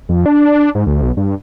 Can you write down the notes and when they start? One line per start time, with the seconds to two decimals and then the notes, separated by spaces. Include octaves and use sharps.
0.09 F2
0.26 D4
0.75 G#2
0.87 D2
1.02 B1
1.17 G2